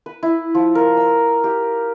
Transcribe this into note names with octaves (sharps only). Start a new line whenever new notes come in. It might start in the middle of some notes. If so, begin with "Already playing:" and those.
B4
E4
F3
A#4
E6
G4